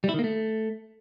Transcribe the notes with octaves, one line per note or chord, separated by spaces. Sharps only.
G3
E4
D#3
A#3
A3